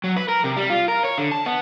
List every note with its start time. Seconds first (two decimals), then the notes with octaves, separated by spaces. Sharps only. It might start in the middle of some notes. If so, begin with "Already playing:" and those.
0.04 F#3
0.17 B4
0.28 A#4
0.44 C3
0.57 G3
0.70 F4
0.88 A#4
1.05 C#5
1.18 D3
1.32 A5
1.46 B3